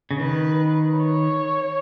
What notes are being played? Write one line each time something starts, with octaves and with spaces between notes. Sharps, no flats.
C#3
D#3 B4
C#5